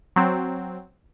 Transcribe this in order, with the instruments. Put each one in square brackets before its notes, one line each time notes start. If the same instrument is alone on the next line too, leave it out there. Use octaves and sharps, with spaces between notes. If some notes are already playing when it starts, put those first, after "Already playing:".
[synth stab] F#3 C4